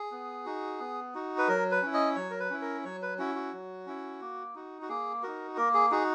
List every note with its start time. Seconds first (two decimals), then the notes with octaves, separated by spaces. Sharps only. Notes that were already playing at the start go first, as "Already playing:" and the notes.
Already playing: G#4
0.12 B3
0.46 D#4 F#4
0.80 B3
1.14 D#4 F#4
1.38 B4
1.48 F#3 A#4
1.71 B4
1.82 C#4 E4
1.94 D#5
2.16 F#3 C#5
2.30 A#4
2.40 B4
2.50 C#4 E4
2.61 A#4
2.85 F#3 C#5
3.02 B4
3.19 C#4 E4 F#4
3.36 F#4
3.52 F#3
3.86 C#4 E4
4.21 A#3
4.55 D#4 F#4
4.82 F#4
4.89 A#3 G#4
5.23 D#4 F#4 A#4
5.57 A#3 A#4
5.74 G#4
5.91 D#4 F#4 G#4